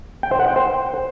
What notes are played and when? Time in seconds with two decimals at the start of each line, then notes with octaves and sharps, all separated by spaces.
0.23 G5
0.31 C5
0.40 F#5
0.48 G5
0.56 C5